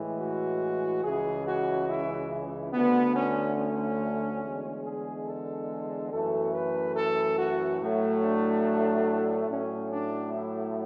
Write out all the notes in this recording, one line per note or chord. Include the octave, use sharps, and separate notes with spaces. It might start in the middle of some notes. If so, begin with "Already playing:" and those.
Already playing: A2 E3 G#3
F#4
C#2 C#3 E3 G#4
F#4
E4
D2 D3 A3 B3
C#4
C#4
E2 D3 G#3
G#4
A4
F#2 E3 A3 A4
B4
A4
F#4
A2 F#3 A3
D4
A2 F#3 A3 C#4
D4
E4